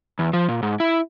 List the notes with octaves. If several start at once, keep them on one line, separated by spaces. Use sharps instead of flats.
E2
F3
A#2
G#2
E4